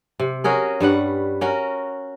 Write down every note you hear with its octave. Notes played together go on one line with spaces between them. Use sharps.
C3
C#4 F#4 G#4 A#4
G2 G3 B4 F#5
C#4 F#4 A#4